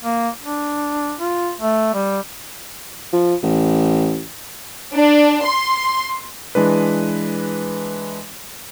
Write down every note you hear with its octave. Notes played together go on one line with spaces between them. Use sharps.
A#3
D4
F4
A3
G3
F3
A1
D4
C6
E3 G#3 D4 B4